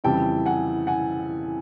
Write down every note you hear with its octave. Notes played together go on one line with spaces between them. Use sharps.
F2 C#3 E3 G3 G5 A5
F#5 G#5
F#5 G#5